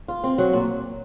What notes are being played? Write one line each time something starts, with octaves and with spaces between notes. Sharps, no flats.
F4
C4
F#3
A#2